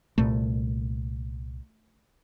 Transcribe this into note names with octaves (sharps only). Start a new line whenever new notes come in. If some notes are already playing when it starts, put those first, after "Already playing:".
C2 A#2 A3